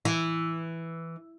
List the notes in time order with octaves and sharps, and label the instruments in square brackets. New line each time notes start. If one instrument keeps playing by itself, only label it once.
[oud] E3